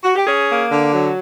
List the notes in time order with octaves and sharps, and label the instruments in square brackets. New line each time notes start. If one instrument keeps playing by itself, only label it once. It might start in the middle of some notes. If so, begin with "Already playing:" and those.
[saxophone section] F#4
G4
C#4 G#4
A#3
D3
F#3